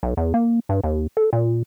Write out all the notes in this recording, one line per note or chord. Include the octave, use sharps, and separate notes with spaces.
B1
E2
A#3
G2
D#2
A4
A#2